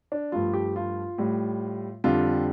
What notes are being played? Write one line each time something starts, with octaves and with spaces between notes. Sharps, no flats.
D4
G2 F3 A3 F4
G4
F4
A2 G3
F2 D3 G3 F4